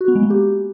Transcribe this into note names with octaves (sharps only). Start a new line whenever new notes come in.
F#4
B3
G#3
A#3
G4